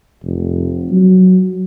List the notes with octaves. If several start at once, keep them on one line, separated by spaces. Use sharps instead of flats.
F1
F#3